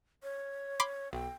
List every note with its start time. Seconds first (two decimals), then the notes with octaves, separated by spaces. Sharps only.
0.23 C#5
0.80 B5 C6 D6
1.13 B1 G5